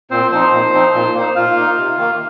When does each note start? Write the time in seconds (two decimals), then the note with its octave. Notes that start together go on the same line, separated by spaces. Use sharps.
0.11 A#2 C4 C5
0.31 F3 C4 D#4 C5
0.52 A#2
0.73 F3 C4 D#4
0.94 A#2
1.15 A#3 D#4
1.36 A#2 F4 F5
1.56 A#3 D#4
1.77 C3
1.98 D#3 A#3